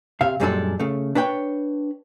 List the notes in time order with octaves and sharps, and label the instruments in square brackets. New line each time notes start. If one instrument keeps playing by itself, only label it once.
[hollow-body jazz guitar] C3 E5 F5
F#2 A#2 G3 G#3 D4 A4
C#3 A3
D4 B4 C#5 G5